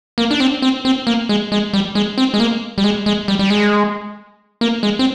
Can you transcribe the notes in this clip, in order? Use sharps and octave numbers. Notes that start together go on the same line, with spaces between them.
A#3
D4
C4
C4
C4
A#3
G#3
G#3
G3
G#3
C4
G#3
A#3
G3
G#3
G#3
G3
G3
G#3
A#3
G#3
C4